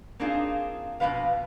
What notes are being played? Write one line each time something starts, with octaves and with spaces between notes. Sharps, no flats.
A#3 C4 D4 D#4 F4 G#4
F2 B2 E3 B3 B4 F5